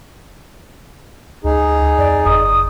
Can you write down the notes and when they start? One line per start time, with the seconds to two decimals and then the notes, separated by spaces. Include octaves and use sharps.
1.44 D2 D#4 G#4
1.98 F2 D5
2.25 F#1 D#6